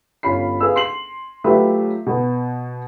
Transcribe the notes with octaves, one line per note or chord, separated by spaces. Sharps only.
G1 C#4 F4 B5 C7
G#4 B4 F5 E6
C6 C7 F#7
F#3 A3 F4 G4 B4 E5
B2 B3